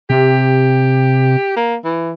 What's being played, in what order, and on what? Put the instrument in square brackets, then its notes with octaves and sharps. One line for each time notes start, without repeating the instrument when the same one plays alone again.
[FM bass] C3 [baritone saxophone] G4
[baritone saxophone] A#3
E3